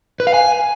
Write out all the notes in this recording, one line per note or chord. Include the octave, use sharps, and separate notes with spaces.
B4
F5
G#5